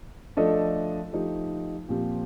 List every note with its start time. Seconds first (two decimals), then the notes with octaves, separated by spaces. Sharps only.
0.37 F3 A3 D4 A4 D#5
1.13 F3 A3 D#4 G4
1.89 A#2 F3 C4 G4